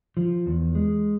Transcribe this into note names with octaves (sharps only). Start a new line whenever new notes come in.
F3
E2
G#3